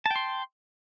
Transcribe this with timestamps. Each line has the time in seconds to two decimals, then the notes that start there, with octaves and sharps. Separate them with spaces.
0.06 A5
0.11 G5
0.16 C6